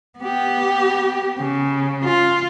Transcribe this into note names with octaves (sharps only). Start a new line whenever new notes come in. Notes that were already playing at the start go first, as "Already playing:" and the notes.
B3 G4
C#3
F4